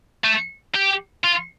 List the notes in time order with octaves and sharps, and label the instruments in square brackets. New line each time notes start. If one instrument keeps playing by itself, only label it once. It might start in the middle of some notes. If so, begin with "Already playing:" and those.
[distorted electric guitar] A3
G4
F4